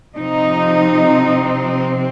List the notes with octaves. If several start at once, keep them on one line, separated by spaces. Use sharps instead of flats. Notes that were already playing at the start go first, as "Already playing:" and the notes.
C3 F3 C4 D#4